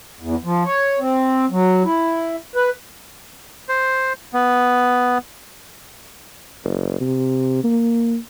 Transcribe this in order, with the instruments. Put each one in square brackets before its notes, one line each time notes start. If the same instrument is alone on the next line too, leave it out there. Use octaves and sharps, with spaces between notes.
[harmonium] E2
F3
C#5
C4
F#3
E4
B4
[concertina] C5
B3
[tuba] F#1
C3
A#3